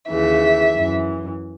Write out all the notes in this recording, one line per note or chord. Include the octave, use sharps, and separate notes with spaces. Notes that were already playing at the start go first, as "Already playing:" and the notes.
D#2 C#3 E3 E5
F#2 E3